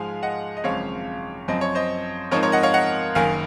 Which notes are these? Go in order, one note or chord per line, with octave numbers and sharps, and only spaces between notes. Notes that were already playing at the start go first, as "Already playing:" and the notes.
Already playing: G#2 F3 G#3 F5 G#5
D#5 F#5
D#5
G#1 F#2 C#3 F3 C4 C#5 F5
F#2 F3 C4 D#5
C#5
C5 D#5
G#2 F3 C4 D#4 A#4 C#5
A#4 C#5
D#5 F#5
C#5 F5
D#5 F#5
F#1 F#2 D#3 F5 G#5